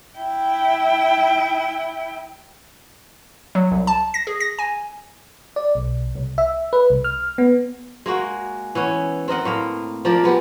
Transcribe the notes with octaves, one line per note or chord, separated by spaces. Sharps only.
E4 G5
F#3
C2
A5
A#6
G#4
A#6
G#5
D5
B1
C2
E5
B4
C2
F6
B3
G#3 A#3 F#4
E3 B3 C#4
C4 A#4 D#5 F#5
A2 A#3 F5
F3 A#3 A#4 D5
G#3 B3 G4